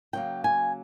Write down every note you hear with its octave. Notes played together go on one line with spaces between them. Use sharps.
C#3 F#3 A#3 G5
G#5